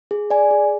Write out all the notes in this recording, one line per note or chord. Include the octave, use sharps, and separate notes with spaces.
G#4
D5 G#5
G#4